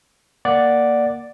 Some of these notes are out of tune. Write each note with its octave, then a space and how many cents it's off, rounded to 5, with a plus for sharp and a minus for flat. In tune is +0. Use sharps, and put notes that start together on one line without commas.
A#3 +0 D5 +0 F#5 +0